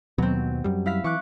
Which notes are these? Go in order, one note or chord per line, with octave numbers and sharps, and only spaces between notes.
D#2 B2 F#3 C4
F#2 G3
E4 F5 B6
E3 C#6 D6 F#6